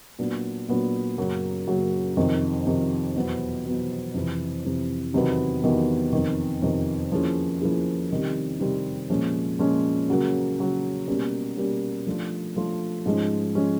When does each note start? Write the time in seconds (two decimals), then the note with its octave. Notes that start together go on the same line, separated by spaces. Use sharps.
0.19 A#2 F#3 B3 D4
0.68 A#2 F#3 B3 D4
1.18 F#2 C#3 F#3 A#3
1.67 F#2 C#3 F#3 A#3
2.17 F2 C3 D#3
2.66 F2 C3 D#3
3.16 E2 B2 F#3 B3
3.65 E2 B2 F#3 B3
4.14 F2 C3 E3
4.65 F2 C3 E3
5.14 E2 C3 D#3 F#3 B3
5.63 E2 C3 D#3 F#3 B3
6.13 F2 C3 D#3
6.62 F2 C3 D#3
7.12 F3 A#3 C#4 E4 G#4
7.62 F3 A#3 C#4 E4 G#4
8.11 C3 D#3 G3 C4
8.60 C3 D#3 G3 C4
9.10 A#2 F3 G#3 C#4
9.59 A#2 F3 G#3 C#4
10.09 C#3 F#3 A#3
10.58 C#3 F#3 A#3
11.07 B2 G3 A#3 C#4
11.57 B2 G3 A#3 C#4
12.07 F3 A3 D4 F4
12.56 F3 A3 D4 F4
13.06 G#2 F3 G#3 C#4
13.55 F3 G#3 C#4